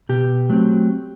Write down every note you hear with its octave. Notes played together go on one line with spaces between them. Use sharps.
B2 G4
F#3 A3 C4